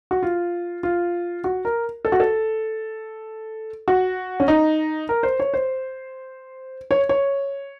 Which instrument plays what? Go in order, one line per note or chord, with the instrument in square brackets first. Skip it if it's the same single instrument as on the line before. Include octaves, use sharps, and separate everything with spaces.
[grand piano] F#4
F4
F4
F#4
A#4
A4
F#4
A4
F#4
C#4
D#4
A#4
C5
C#5
C5
C#5
C#5